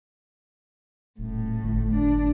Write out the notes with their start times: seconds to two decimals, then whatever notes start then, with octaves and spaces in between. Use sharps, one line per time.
1.19 D#1 A2
1.63 G1
1.94 D4